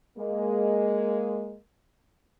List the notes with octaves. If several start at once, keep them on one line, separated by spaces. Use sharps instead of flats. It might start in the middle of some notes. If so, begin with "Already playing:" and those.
G#3 A#3